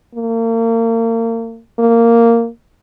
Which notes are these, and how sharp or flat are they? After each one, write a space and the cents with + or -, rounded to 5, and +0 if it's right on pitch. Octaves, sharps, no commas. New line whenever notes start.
A#3 -35
A#3 -10